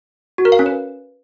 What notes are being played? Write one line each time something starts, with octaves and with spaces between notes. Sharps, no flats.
F#4
A#4
F5
C#4
B4